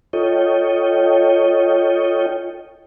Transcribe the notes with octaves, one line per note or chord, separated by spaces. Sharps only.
F4 A4 C#5 D#5 G5